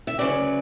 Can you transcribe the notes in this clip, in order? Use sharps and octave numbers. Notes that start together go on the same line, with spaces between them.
E5
D2 C#3 F#3 C#4 B4 D5